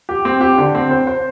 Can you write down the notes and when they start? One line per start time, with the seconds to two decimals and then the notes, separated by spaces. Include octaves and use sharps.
0.09 G4
0.25 C4
0.41 G4
0.58 D3
0.75 C4
0.91 C5
1.07 C5